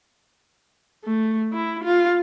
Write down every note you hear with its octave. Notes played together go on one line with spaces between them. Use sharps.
A3
E4
F4